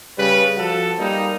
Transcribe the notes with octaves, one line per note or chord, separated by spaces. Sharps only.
C#3 G3 B4
F3 F#4 A4
G3 A#3 D#4